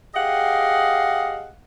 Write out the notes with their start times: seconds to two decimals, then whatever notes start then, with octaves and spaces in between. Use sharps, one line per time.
0.15 G4 G#4 D#5 F5 F#5